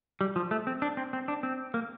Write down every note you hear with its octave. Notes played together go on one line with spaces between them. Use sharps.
G3
F3
A3
C4
D4
C4
C4
D4
C4
A#3